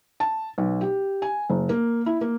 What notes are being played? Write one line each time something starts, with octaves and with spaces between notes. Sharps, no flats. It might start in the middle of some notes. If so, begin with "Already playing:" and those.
A5
B1
G4
G#5
F#1
A#3
E4
A#3